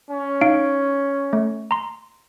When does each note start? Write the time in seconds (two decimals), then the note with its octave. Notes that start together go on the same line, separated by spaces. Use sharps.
0.11 C#4
0.41 D#4 F5 D7
1.33 A3
1.71 A#5 C6